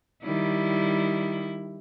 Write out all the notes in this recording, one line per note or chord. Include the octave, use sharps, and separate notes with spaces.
D#3 G3 E4